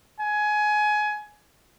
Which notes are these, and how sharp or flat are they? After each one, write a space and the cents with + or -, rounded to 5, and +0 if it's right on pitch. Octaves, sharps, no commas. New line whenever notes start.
G#5 +20